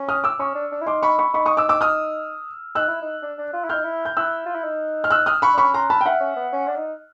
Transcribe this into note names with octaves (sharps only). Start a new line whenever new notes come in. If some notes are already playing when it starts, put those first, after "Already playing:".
Already playing: C#4
D#6 F6
D6 E6
C#4 C#6 D#6
D4
D4
E4
D#4 C6 D6
B5 C#6
B5 C#6
D#4 B5 C#6
C#6 D#6
D6 E6
D6 E6
D#6 F6
D#4 E6 F#6
E4
D#4
D4
D4
F4
E4
D#4 F6 G6
E4
G6
E4 E6 F#6
F4
E4
D#4
F6
E6 F#6
D#6 F6
B5 C#6
D4
C#4 B5 C#6
A#5 C6
A5 B5
G5
E5 F#5
C#4
B3
C#4
D4
D#4